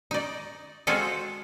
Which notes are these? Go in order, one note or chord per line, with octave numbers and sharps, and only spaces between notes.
D#4 D5
G#3 C4 F4 F#4 G#4 A4